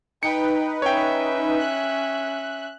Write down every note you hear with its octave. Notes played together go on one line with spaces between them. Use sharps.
D#4 B4 G5 C#7
C#4 C#5 E5 G5
F#6